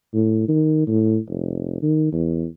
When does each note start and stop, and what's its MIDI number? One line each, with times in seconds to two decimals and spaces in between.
0.14 0.44 45
0.48 0.83 51
0.87 1.18 45
1.29 1.77 29
1.82 2.08 51
2.12 2.46 40